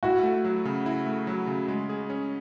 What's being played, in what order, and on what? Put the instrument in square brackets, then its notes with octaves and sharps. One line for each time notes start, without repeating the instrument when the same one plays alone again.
[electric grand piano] E4 [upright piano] F#4
[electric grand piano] A3
F#3
C#3
E4
A3
F#3
C#3
G#3
G#4
C#4